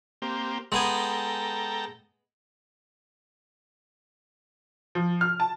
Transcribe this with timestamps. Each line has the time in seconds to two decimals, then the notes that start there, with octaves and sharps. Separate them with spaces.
0.22 A#3 C4 G4
0.72 G#3 B3 A4 G5 G#5 A#5
4.95 F3
5.21 F6
5.40 A5